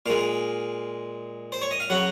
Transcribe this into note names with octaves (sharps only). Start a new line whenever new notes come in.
A#2 G#3 F5
C5
C#5
D#5
F5
C#3 F#3 F#5